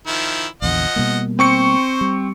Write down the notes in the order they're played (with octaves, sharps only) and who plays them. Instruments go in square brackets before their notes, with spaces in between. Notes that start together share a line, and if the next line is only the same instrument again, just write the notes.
[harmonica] D#3 F3 E4
[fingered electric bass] A#1 E2 D3 [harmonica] F3 D#5 F#5
[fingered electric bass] B2 G3 A#3
[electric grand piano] C4 C#6 C#7 [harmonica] C5
[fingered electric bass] G3